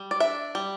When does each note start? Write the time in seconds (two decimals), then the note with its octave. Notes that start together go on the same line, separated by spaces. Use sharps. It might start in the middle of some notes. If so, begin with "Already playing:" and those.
Already playing: G3
0.11 D5
0.20 D4 E5
0.55 G3